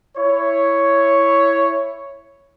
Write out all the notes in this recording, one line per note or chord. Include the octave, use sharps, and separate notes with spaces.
E4 C#5